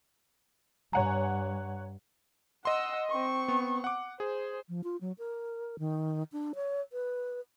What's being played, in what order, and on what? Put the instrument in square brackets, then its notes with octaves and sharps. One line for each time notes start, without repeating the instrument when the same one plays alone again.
[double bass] G2 [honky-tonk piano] C#5 F#5 G#5 [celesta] A#5
[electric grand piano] D#5 C6 [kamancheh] F#5 E6
[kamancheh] C4 C#6
[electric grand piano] B3
F#5 D6
[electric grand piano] G#4 [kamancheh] C5
[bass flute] F3
F4
F#3
A#4
D#3
D4
C#5
B4